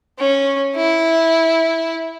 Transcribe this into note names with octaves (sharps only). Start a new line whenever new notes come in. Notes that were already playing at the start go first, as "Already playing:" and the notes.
C#4
E4